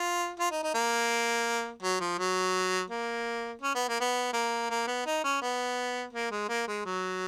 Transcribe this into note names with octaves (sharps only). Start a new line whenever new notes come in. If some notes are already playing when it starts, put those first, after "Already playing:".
Already playing: F4
F4
D#4
D#4
A#3
F#3
F3
F#3
A#3
C#4
B3
A#3
B3
A#3
A#3
B3
D#4
C#4
B3
A#3
G#3
A#3
G#3
F#3